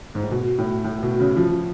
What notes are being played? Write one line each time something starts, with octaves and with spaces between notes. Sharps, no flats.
G#2
A2
B2
A2
A2
B2
C#3
F3